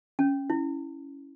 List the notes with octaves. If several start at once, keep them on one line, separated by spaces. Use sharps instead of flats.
C#4
E4